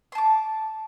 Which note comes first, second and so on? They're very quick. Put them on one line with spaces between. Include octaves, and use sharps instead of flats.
C6 A5 D6